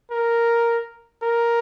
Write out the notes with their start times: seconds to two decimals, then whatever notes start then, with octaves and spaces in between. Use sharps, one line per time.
0.11 A#4
1.22 A#4